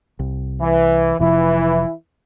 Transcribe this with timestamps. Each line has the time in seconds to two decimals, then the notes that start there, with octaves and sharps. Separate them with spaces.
0.19 C2
0.60 E3
1.19 F1 C3 E3 F3 E4